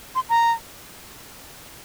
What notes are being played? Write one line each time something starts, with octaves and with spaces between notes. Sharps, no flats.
C6
A#5